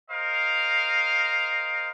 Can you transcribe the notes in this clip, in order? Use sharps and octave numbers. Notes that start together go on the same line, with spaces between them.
A#4 C5 D#5 F5